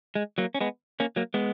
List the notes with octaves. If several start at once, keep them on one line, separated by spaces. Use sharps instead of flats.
G#3
F#3 A#3
C#4
G#3 B3
A#3 C#4
F#3 A#3
G#3 B3